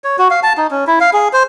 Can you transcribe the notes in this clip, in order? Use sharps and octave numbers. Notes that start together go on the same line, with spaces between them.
C#5
F#4
F5
A5
D#4
C#4
E4
F5
G#4
C5